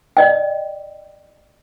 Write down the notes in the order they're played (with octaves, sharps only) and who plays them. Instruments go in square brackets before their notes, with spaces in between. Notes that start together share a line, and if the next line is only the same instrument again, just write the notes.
[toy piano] D5 D#5 G5